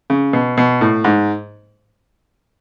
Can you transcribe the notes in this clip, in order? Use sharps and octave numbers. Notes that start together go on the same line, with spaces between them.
C#3
B2
B2
A2
G#2